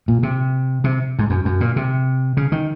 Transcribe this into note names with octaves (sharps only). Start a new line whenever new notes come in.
A#2
C3
C3
G#2
F#2
F#2
A#2
C3
C#3
D#3